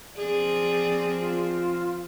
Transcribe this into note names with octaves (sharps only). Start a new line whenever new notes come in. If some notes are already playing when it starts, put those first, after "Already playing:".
F3 C4 G#4 D5
F4